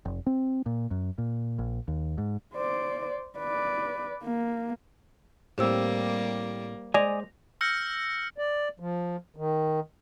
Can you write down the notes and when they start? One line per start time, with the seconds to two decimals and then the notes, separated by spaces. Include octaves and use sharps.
0.05 F1
0.26 C4
0.66 A#2
0.91 F#2
1.18 A#2
1.59 A#1
1.88 D#2
2.18 G#2
2.54 C5 D5
3.38 B4 D5
4.23 A#3
5.58 A2 G3 A#3 C4 G4 C5 E6
6.94 G#3 C5 D5 D#5 G#5 A#6 F7
7.61 E6 F6 G6 A#6 C#7
8.38 D5
8.80 F3
9.36 D#3